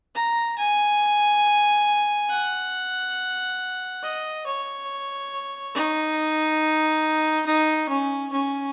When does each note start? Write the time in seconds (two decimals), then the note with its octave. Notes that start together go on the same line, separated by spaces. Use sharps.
0.15 A#5
0.58 G#5
2.30 F#5
4.03 D#5
4.46 C#5
5.74 D#4
7.46 D#4
7.89 C#4
8.32 C#4